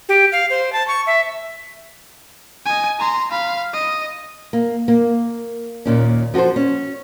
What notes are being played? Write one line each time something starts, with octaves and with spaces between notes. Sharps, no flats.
G4
F5
C5
A5
C#6
E5
D#5 G#5
A#5 C6
F5 B5
D#5
A#3
A#3
D#2 A#2 C#4
F3 F#4 G#4 A4 C5
C#4